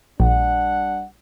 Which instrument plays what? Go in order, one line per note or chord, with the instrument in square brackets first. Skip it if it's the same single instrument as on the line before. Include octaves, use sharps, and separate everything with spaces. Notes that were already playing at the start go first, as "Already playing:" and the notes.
[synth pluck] A#1 [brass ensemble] G3 D4 F#5